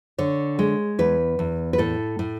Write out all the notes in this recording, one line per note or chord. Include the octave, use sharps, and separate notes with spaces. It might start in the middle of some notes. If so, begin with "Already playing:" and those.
D3 C#5
G#3
E2 B4
E2
B4
A2 A4
A2